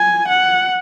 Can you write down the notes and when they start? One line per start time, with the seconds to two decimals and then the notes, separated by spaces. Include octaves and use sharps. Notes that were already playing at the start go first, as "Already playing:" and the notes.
Already playing: G#5
0.29 F#5